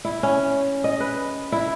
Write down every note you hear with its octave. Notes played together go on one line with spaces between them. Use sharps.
E4
C#4
D#5
B4
E4